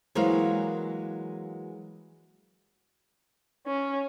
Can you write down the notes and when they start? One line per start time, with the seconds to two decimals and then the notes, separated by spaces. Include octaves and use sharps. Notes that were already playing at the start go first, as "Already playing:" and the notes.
0.15 E3 F#3 G#3 A#3 C5 F5
3.67 C#4